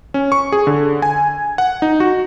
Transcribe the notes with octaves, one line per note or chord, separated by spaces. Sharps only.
C#4
C#6
G#4
D3
G#5
F#5
D#4
F#4